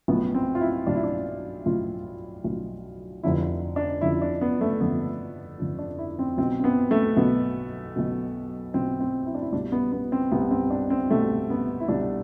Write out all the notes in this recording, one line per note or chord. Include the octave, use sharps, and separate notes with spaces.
B1 A2 F3 B3
C4
F4
E4
B1 A2 F3 D4
E4
D4
B1 A2 F3 F4
B1 A2 F3
F1 F2 D3 F3 E4
D4
F1 F2 D3 F3 E4
D4
B3
A3
F1 F2 D3 F3 B3
F1 F2 D3 F3
D4
E4
C4
B1 B2 C4
C4
B3
A3
B1 B2 B3
B1 B2
B1 B2 C4
C4
E4
D4
E4
C2 B2 D4
B3
B3
C4
C2 B2 B3
C4
D4
C4
C2 B2 A3
B3
E4
C2 B2 D4